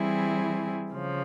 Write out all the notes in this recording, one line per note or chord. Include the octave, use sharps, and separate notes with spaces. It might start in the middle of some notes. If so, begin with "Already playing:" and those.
Already playing: E3 G3 C4 E4 G#4
C#3 F3